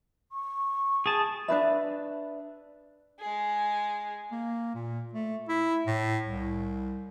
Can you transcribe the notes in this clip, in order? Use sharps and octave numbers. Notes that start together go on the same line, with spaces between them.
C#6
G#4 A5
D4 D#4 B4 E5
G#3 G#4
A#3
A#2
A3
E4
A2
C2